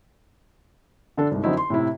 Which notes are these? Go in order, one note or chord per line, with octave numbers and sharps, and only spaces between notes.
D3 D4 A4
C2 G#2
F#2 D3 F#3 C4 D#4 E4
C6
A2 C3 E4